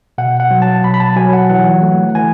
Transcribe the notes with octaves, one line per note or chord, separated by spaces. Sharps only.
B2 F#5
F#5
F#3
A5
B2 B5
B5
A5
F#3 G#5
F#5
E3 F#5
A3
E3 G#5